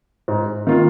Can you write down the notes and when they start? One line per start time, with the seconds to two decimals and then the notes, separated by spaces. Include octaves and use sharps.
0.28 G#2
0.67 D#3 A#3 F4